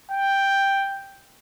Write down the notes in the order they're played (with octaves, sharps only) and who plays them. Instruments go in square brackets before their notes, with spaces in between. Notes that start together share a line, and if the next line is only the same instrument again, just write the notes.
[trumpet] G5